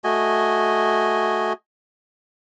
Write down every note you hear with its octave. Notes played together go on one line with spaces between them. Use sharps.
A3 F#4 D#5 G#5